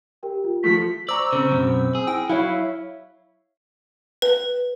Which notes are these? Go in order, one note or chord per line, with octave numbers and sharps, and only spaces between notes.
G4 A#4 G5
F4
F3 A3 B6
C5 D5 A#5 C#6 E6
C#3 C4 C5
F#2 B2
G#4
E4 G5
F#3 E4 C#5 E5 F5
B4